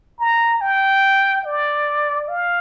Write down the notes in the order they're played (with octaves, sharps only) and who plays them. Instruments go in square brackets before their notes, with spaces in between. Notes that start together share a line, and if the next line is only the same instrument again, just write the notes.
[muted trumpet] A#5
G5
D5
F5